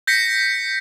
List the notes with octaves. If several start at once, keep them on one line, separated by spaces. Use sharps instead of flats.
G6 A#6 B6 C#7